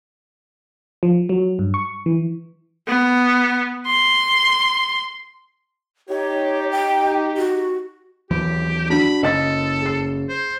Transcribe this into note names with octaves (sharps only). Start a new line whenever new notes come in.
F3
F#3
G2
C#6
E3
B3
C6
D#4 G4 C#5
G5
F#4
D#2 E3 F#3 G4
D4 F#4 B5
F#1 C#3 A4 D#5 A6
G#4 C7
C5